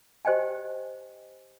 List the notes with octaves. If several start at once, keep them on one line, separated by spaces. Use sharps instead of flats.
G4 C5 D#5 G5 G#5